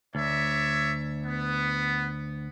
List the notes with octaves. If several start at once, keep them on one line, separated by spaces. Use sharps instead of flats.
D2 C#5 D5 E5
B3